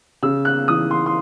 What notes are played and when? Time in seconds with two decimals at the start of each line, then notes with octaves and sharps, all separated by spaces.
0.23 C#3 E6
0.45 F#6
0.68 E3 D#6
0.91 C6
1.06 C6